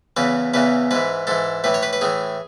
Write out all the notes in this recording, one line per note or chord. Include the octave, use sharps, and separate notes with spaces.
E2 C#3 E3 B4
E2 C#3 E3 B4
G#2 E3 B4
G#2 E3 A4
A2 E3 B4
C#5
B4
B4
A2 E3 G#4